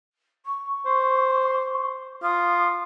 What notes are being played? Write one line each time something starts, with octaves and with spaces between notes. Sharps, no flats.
C#6
C5
F4 D#6